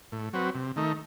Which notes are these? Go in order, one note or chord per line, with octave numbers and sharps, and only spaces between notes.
A2
F#3 C4 F#4 B4
C3
D#3 A3 D#4